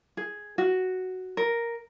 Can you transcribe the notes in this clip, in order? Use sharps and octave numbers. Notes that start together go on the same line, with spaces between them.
G#4
F#4
A#4